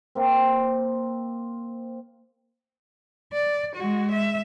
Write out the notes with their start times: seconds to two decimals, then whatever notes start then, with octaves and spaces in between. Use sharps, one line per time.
0.15 A#3 C4
3.33 D5
3.76 G#3 F#4
4.12 E5